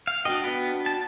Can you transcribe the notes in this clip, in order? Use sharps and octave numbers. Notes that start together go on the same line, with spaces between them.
F5
D4 F#4 D#5 G5
B3
A5